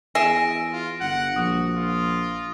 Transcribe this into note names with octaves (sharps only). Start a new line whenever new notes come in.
E2 G#4 E5 A#6 D7
F4
G1 F#5
A#1 F#4 D#6
F4